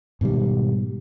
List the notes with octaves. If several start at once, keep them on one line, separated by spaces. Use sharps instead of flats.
G#2 B2 D#3 G3